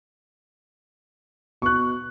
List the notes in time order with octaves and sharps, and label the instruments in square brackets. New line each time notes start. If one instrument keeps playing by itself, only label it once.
[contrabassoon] B2 [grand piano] C#6 F#6